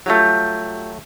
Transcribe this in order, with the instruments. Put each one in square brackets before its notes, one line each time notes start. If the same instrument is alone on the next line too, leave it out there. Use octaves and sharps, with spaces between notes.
[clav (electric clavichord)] F#3 A3 [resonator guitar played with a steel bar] G3 F4 G4